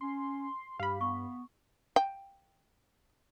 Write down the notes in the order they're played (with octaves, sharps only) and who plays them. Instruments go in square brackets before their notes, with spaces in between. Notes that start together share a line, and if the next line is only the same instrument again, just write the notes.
[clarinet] C#4 [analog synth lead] C6
[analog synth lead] G2 [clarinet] G4 [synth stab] F5 B5
[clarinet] B3 [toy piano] C#6
[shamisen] G5